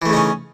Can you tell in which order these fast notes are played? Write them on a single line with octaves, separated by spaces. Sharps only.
E3 A3 C#3 D#4 C#4